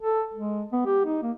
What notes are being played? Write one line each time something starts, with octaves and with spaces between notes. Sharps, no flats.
A4
G#3
B3
G4
D#4
A#3